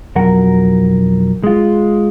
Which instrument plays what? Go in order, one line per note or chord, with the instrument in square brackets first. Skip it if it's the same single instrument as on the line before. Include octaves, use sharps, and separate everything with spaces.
[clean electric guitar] B1 F2 F#3 A#4 F#5
G#3 F4